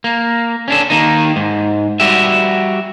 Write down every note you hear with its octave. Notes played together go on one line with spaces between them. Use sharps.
A#3
C#4 D4 A4
D#3 A#3 D#4
G#2
G3 F#4 G4 E5